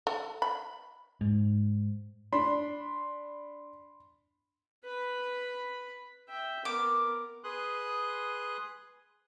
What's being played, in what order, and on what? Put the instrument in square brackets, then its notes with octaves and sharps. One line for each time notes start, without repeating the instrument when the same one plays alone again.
[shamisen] A4
B5
[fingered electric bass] G#2
[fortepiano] D4 [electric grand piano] B5 C6
[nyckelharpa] B4 B5
E5 G5
[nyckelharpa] B3 A#4 [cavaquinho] D6
[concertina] G#4 B4 C6 D#6 F#6